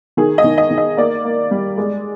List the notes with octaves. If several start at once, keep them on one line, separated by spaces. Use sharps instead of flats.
D#3 G#4
D#5
D#3
D#5
D#3
D#5
A#3 D5
A#3
G3
G#3